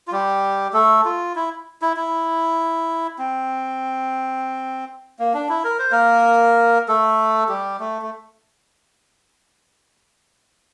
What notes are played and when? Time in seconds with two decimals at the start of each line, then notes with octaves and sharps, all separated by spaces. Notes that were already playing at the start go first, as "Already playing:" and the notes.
0.08 F4
0.12 G3 G4
0.73 A3 A4
1.05 F4
1.36 E4
1.82 E4
1.97 E4
3.19 C4
5.19 A#3
5.34 D4
5.49 E4
5.64 A#4
5.79 C5
5.91 A#3 A#4
6.88 A3 A4
7.49 G3 G4
7.80 A3
8.02 A3